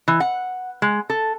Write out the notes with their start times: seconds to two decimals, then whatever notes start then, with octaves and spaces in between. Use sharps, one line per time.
0.08 E3
0.20 F#5
0.82 G#3
1.10 A4